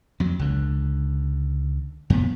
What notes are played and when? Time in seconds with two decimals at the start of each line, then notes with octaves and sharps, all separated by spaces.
0.20 F2 F#3
0.39 C#2 D3
2.10 F2 A#2 B3